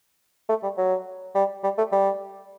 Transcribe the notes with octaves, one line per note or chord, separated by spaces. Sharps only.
A3
G3
F#3
G3
G3
A3
G3